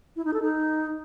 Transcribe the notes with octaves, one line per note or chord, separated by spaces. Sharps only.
E4
D#4
A4
D#4